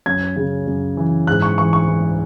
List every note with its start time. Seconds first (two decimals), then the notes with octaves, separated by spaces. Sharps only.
0.06 F#2 G#6
0.36 C#3
0.67 F#2
0.97 E3
1.27 G#2 F#6
1.42 C#6
1.58 E3 C#6
1.73 C#6
1.88 E3